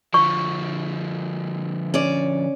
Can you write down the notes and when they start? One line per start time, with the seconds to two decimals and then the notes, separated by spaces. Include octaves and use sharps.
0.14 D3 F3 C#6
1.94 C#4 D5